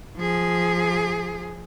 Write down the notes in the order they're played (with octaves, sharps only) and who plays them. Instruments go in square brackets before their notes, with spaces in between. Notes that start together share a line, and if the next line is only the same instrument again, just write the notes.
[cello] F3 G#4